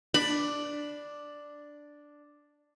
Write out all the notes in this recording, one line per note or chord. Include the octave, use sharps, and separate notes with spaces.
D4 B5